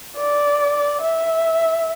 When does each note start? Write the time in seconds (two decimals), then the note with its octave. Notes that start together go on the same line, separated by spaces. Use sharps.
0.17 D5
1.01 E5